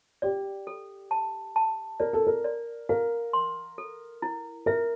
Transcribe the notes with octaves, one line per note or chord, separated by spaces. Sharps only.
G4 D5
A4
A5
A5
A#4 D5
A4
A#4
D5
A#4 F5
C6
A4
E4
A#4 E5